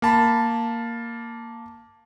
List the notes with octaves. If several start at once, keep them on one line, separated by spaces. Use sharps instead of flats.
A#3 A5 B5